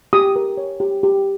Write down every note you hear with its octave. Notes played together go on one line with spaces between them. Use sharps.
G4 D#6
A#4
C#5
G4
G4